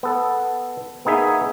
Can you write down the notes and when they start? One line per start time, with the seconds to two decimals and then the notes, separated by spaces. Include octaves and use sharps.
0.03 B3 A4
1.05 A#3 B3 D#4 G#4 E5